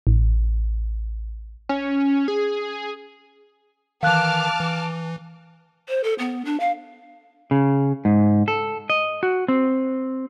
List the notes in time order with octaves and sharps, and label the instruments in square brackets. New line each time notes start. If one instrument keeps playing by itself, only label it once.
[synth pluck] A1
[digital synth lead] C#4
G#4
[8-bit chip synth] D#3 E3 [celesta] F5 F#6 [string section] A5 D6 F6
[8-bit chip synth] E3
[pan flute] C5
A4
B3
D4
F5
[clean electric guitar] C#3
G#2
A4
D#5
F#4
C4